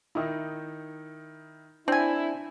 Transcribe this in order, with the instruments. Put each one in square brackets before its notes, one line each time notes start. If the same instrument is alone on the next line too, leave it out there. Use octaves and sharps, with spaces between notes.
[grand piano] D#3 D#4 E4
[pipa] C4 G#5 [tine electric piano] D4 [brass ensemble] E4